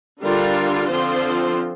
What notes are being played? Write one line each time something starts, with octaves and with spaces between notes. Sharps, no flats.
D3 G3 D4 F4 A#4
D3 F3 C4 F4 C5